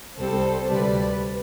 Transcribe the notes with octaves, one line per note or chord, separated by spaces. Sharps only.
C2 C3 G3 C4 A4 C5
D2 C3 G3 B4 D5